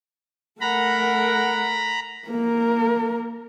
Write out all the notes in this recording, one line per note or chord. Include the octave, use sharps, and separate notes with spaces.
A3 A#4 F#5 A#5 B5
A#3 A#4